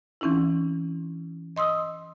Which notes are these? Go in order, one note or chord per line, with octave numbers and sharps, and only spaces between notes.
E3 C4 C#4 D#4 E4
D#5 C6 D#6 E6